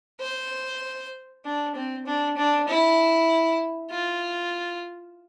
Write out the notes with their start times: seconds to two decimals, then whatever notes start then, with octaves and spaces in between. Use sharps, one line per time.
0.20 C5
1.45 D4
1.75 C4
2.06 D4
2.37 D4
2.68 E4
3.91 F4